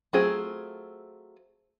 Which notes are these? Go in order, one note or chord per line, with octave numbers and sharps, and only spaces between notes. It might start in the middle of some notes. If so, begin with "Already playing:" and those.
F#3 A3 C4 F4 G#4